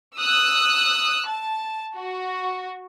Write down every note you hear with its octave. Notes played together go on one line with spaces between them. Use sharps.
D#6 E6 F#6
A5
F#4